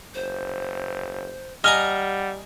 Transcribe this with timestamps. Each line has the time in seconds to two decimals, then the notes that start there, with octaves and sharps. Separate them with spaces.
0.14 F#1 C5
1.64 G3 D#5 F#5 G#5 A#5 F6